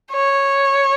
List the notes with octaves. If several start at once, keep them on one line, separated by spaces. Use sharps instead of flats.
C#5